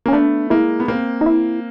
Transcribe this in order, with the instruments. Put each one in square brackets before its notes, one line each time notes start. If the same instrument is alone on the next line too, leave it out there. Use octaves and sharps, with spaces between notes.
[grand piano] A#3 [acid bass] C#4
[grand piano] A3 B3 [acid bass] D4
[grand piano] G#3 A#3 [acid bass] E4
[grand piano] B3
A#3 C4
[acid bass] D#4
E4